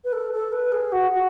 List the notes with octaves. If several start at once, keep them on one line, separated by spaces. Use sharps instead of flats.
B4
A4
A4
B4
G#4
F#4
F#4